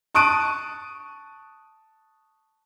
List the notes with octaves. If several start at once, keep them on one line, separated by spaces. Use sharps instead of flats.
A5 C#6 D#6 F#6 D7 D#7